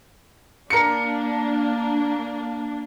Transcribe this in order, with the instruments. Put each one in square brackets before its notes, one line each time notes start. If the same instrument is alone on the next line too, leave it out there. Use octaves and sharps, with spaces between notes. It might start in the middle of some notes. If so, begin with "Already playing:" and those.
[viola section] A#3 D4 [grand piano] A#4 C#7